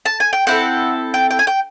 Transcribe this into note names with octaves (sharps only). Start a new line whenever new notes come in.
A5
G#5
G5
C4 E4 A4 F#5
G5
G5
G#5
G5